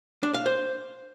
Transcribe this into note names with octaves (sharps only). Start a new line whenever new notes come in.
D4
F5
C5